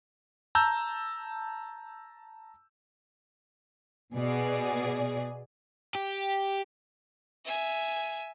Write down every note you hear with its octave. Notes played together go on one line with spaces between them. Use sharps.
A5 A#5 E6 G6
B2 G#4 D5
G4
E5 G#5